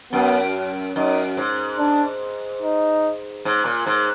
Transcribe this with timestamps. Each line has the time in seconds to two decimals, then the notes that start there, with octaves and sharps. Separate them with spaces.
0.12 F#2 B3
0.96 F#2 D#4
1.37 G#2
1.79 D4
2.62 D#4
3.45 G#2
3.65 A#2
3.86 G#2